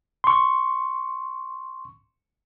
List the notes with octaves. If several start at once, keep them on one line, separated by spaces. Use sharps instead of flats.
C6 C#6